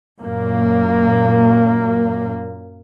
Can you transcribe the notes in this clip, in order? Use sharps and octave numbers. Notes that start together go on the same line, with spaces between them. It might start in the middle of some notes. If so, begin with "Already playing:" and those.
F#2 A#2 A#3